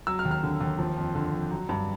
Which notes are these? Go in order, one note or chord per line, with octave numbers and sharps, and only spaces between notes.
F#3 E6
F6
D#2
F6
D3
D#2
F3
F2
D3
F2
F#3
G2